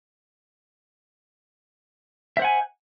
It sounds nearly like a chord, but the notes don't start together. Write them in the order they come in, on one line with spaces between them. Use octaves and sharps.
E5 C5 F#5 G#5